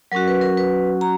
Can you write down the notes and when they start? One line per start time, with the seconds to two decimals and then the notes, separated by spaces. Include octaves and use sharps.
0.12 F#3 C#4 F#4 A#4
0.28 B4
0.41 A#4
0.57 B4
1.01 A#5